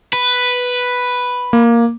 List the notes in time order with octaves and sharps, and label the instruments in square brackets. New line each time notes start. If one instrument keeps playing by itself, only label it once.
[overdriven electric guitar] B4
[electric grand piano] A#3